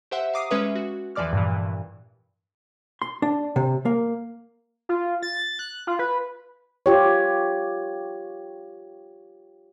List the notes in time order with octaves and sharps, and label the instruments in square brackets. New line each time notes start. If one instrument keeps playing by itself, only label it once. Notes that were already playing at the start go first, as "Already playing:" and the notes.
[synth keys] G4 C5 E5 F#5
F5 A#5 D6 D#6 C7
G#3 C#4 B4 E5
F#4
E2 E3 F3 D5 D6 F6
G2 A#2 E3
[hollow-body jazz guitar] C6
D4
C3
A#3
[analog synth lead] F4
A6
F#6
F4
B4
[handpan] F4 G4 C#5